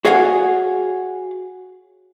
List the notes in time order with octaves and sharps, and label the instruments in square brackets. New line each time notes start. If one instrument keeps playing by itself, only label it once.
[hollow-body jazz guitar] F#4 G#4 C#5 F5 F#5 G#5